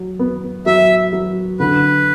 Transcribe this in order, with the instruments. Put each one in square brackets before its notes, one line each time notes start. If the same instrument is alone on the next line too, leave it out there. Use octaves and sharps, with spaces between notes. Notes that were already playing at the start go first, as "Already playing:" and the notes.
Already playing: [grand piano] F#3
B3
[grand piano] F#3 [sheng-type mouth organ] E5
[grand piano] F#3
[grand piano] D3 [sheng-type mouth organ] B4